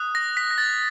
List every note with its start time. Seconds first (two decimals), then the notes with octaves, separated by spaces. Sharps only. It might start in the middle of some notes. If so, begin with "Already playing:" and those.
Already playing: D#6 F#6
0.15 A#6
0.37 B6
0.51 A#6
0.58 A6